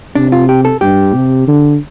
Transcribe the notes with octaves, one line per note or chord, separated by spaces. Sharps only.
C3 D4
F4
G4
A4
G2 G4
C3
D3